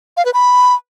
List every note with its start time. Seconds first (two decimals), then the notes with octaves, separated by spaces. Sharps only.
0.17 F5
0.25 B4
0.34 B5